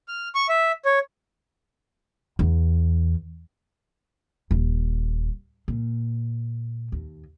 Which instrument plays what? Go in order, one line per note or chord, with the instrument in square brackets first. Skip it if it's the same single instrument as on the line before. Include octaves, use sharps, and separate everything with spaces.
[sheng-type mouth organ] F6
C#6
E5
C#5
[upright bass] E2
D#1
A#2
D#2